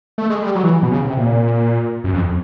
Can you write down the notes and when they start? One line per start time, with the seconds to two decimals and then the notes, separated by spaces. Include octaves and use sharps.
0.18 A3
0.30 G#3
0.42 G3
0.55 F#3
0.63 E3
0.83 B2
0.91 C#3
1.05 C3
1.17 A#2
2.04 F#2
2.14 F2